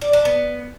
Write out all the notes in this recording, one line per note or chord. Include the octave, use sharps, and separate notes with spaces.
D5
D4
B3